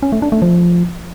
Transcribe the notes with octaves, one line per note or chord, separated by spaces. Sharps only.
C#4
A3
D4
A3
F3